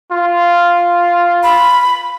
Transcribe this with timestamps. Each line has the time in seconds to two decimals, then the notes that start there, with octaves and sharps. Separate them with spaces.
0.12 F4
1.43 B5